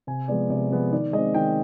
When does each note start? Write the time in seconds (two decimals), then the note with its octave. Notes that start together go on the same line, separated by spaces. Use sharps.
0.07 C3 G#5
0.28 F3 G#3 B3 D5
0.50 C3 D5
0.71 F3 G#3 B3
0.92 D#3 D5
1.13 G#3 C4 D#5
1.34 D#3 G5